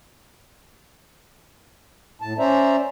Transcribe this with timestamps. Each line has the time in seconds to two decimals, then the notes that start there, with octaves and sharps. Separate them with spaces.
2.21 A2 A5
2.39 C#4 C5 D5 E5 A#5